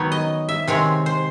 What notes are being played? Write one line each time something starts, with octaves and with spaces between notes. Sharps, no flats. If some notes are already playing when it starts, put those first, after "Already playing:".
Already playing: D#3 F#3 B3 D#4 C#5
D#5
E5
C3 D#3 G#3 C4 C#5
C5